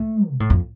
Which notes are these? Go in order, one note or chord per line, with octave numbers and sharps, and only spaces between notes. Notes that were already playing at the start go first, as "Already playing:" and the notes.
Already playing: A3
B2
A2
F2